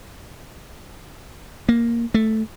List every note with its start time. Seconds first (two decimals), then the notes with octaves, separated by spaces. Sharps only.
1.69 A#3
2.14 A3